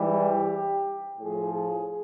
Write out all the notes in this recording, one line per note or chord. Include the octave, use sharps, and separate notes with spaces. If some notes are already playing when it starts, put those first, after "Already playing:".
Already playing: G#2 E3 G3 G4
A2 F3 G#4
G#4